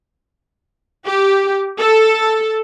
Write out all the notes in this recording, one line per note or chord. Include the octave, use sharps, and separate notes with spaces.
G4
A4